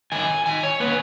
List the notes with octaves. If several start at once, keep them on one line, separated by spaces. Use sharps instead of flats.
D#3 F#3 G#5
D#3 G#5
C#5
A#3 C#4 B4